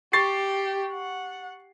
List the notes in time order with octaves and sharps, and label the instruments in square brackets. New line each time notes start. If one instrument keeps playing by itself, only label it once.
[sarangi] G4 [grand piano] C#6 A6 C7
[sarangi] F#5